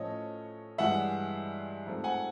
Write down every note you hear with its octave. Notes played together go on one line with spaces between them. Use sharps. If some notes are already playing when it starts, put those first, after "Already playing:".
Already playing: A2 F3 A3 C#4 C#5 D#5
G2 E3 G#3 E5 F#5
G#2 F3 A3 C4
F#5 G#5